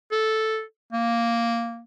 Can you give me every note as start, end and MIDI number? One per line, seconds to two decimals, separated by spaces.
0.12 0.63 69
0.93 1.83 58